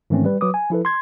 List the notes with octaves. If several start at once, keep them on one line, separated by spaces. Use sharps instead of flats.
G#2 D#3 E3 A3 C4 C#4
G3 B4
F#3 B4 D6 D#6
G#5
F3 E4 A4 B4
C6 G#6